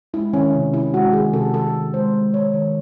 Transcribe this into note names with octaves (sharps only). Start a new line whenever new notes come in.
G#3 E4
D#3 C#4
C3
C3 E4
G#3 F#4
D#3 G#4
C3 A4
D#3 A4
D#3
G#3 C5
G#3
D#3 C#5
D#3